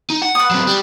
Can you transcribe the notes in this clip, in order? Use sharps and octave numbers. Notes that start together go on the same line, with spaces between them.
D#4
F#5
B4 D#6
F#3 C4
G3